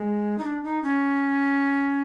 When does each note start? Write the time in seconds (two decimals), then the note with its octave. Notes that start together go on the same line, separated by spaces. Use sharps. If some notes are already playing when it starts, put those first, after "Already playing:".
Already playing: G#3
0.38 D#4
0.44 D4
0.64 D#4
0.83 C#4